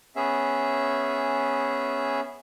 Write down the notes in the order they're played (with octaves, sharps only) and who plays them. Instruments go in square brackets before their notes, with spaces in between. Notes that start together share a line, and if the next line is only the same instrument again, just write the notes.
[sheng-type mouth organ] B3 C#4 G#4 E5